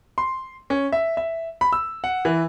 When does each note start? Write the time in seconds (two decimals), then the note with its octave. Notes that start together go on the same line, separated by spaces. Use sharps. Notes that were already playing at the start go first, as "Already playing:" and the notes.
0.18 C6
0.70 C#4
0.93 E5
1.17 E5
1.61 B5
1.73 E6
2.04 F#5
2.25 E3